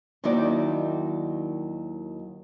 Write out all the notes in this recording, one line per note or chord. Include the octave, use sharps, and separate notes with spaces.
D#2 D#3 F#3 D#4 E4 D5